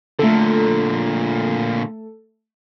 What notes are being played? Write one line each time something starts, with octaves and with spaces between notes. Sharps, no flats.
A#2 D3 A3 A4